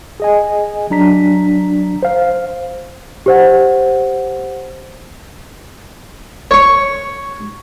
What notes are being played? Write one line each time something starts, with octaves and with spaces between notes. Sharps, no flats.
G#4 D#5 G#5
F#3 D4 A#5 B6
C5 F5
G4 C5 F#5
C#5 C#6